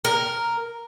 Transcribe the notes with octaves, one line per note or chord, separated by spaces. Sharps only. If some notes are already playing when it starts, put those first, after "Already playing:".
A#4